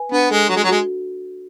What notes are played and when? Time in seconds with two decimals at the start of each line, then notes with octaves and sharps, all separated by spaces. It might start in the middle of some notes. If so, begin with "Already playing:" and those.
Already playing: B4 G#5
0.12 B3 D4
0.30 G#3 A4
0.49 F#3 F#4
0.56 G#3
0.64 F#3
0.68 G#3 F#4